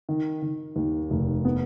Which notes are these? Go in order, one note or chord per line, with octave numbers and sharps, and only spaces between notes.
D#3
D#3
D#2
F1
B3